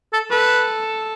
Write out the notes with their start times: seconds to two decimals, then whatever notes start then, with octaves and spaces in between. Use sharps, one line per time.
0.13 A4
0.30 A4 B4